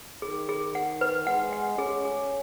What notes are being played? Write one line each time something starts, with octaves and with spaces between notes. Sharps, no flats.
D#3 G#4
G#4
F#5
B4
G#3 F#5
F#5
C#4 G#4
G#4